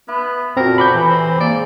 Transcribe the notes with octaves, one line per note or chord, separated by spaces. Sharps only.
B3 E4
A#2 C4 F#4 A4 A#4
F#4 B4 G#5 B5 D6 G6
C3 E3
C4
G#2 A#3 D5